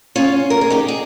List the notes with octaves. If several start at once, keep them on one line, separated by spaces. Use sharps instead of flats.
C#4 F4
A#4
G#4
D#4 G4
G#4